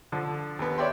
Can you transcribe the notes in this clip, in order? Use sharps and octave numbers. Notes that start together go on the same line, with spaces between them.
D3 F3
D#2 B3
C#5 D5 E5 G5 C6